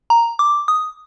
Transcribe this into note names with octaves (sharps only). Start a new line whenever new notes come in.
A#5
D6
D#6